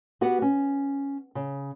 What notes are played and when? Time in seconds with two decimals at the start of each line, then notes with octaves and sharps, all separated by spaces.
0.21 B3 F#4 G4 B4 F#5
0.42 C#4
1.35 C#3